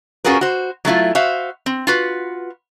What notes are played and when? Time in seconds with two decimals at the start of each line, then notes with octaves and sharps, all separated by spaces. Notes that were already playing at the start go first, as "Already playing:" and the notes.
0.24 C#4 F4 F#4 G#4 A#4 B4
0.41 F#4 C5
0.85 F#3 A3 E4 F4
1.15 F#4 C5 E5 F5
1.66 C4
1.87 F4 F#4 B4